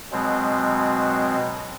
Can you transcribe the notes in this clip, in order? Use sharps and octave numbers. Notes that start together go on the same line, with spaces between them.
B2 F#3 G#3 C4